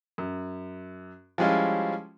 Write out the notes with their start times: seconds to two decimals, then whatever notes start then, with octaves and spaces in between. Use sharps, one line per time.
0.18 F#2
1.38 F3 G3 G#3 C#4 E4 F4